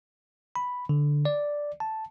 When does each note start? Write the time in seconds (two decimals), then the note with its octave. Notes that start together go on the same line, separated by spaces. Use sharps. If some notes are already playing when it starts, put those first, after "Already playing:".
0.56 B5
0.89 D3
1.25 D5
1.80 A5